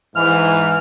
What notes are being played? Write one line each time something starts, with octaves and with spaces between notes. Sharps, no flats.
G#2 E3 F6